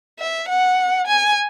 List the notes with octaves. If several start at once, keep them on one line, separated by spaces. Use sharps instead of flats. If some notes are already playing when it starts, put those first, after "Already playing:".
E5
F#5
G#5